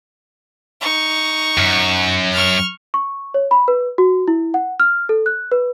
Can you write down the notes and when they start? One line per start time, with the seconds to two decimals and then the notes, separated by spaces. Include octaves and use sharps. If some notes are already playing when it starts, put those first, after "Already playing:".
0.81 D#4 C#6
1.58 F#2
2.33 C#6 F6
2.94 C#6
3.34 C#5
3.51 B5
3.68 B4
3.98 F#4
4.28 E4
4.54 F#5
4.80 F6
5.09 A4
5.26 F#6
5.52 B4